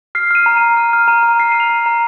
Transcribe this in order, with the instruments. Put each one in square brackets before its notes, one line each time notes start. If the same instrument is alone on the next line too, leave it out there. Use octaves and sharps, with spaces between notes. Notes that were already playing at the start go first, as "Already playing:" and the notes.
[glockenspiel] F6 C7
F6 D#7
A#5
D#7
A#5
F6 D#7
F6
A#5 D#7
A#5
F6 C7
F6 D#7
F7
A#5
A#5